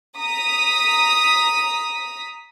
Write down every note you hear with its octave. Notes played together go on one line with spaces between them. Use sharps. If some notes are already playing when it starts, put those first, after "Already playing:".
A#5 D#6 B6